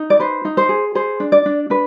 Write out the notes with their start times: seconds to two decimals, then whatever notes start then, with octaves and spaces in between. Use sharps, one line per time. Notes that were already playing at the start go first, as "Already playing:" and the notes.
Already playing: D#4
0.10 D5
0.19 B4 C5
0.45 D#4
0.57 C5
0.69 G#4
0.95 G#4 C5
1.20 D4
1.32 D5
1.46 D4
1.70 D4 B4